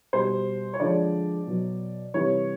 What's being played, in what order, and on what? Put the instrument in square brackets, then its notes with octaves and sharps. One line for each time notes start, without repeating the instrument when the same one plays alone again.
[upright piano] B2 G3 C5
C#5
D3 F3 G#3 D5
B2 F#3
C3 E3 G3 C#5